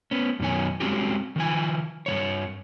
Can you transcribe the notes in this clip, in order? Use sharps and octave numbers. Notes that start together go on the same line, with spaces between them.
B3 C#4
F#2 B2 D#3 C#5 G#5
G3 G#3 C4 C#4 F#4 G4
D#3 F3 G#5
G2 E3 C#5